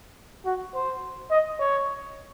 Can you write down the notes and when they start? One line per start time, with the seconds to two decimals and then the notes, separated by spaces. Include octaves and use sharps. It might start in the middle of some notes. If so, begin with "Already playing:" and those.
0.46 F#4
0.75 C5
1.31 D#5
1.60 C#5